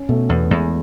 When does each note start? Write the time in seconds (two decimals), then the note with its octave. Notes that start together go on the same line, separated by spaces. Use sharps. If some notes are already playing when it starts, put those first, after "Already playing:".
Already playing: C#4
0.09 B2 A3
0.29 E2 B3
0.50 E2 G#3